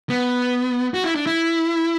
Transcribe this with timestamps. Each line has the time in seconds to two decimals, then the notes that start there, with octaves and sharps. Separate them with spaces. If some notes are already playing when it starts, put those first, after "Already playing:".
0.09 B3
0.94 F#4
1.04 E4
1.16 D4
1.26 E4